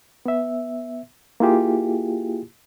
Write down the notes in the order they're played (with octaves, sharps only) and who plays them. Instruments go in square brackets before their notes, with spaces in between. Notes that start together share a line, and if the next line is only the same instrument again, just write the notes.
[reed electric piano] B3 E5
A#3 E4 F4 G4 G#4